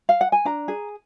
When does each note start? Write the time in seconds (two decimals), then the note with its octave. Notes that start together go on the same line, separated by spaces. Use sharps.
0.09 F5
0.21 F#5
0.32 G#5
0.45 D4 A#5
0.68 G#4